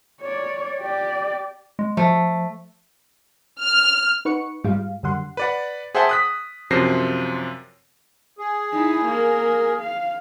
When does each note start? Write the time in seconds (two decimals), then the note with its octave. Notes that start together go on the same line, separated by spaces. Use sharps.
0.21 C#5 D5
0.81 G4 D5
1.79 G#3
1.97 F3 A3
3.61 F6
4.25 D#4 B4 F#5 C#6 C#7
4.64 G#2 G3 G#3 F4 F5
5.03 F#2 D3 G3 F#5 C6
5.37 B4 D5 F#5
5.95 G#4 C5 E5 F#5 G5 A5
6.09 D#6 F#6 B6
6.70 F#2 C3 F3 C5 A#6 C7
8.39 G#4
8.72 D#4 E4
9.05 A#3 A#4
9.81 F5